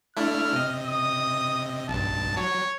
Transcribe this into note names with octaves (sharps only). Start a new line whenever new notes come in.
A3 D4 E4 F6
C3 D#5
D#6
B1 G2 A5
F#3 C#5